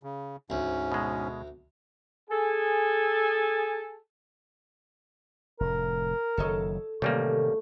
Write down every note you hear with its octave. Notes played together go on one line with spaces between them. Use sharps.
C#3
D2 G#2 C#4
B2 G#3
G#4 A4 G#5
F1 A2 A#4
F#1 D#3 F#3 A4 C#5 D#5
A1 C3 D#3 G3 A3 A#3